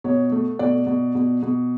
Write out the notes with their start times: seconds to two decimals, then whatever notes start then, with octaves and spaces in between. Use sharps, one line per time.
0.04 B2 C#5
0.32 A3
0.59 B2 D5
0.87 B2
1.15 B2
1.42 B2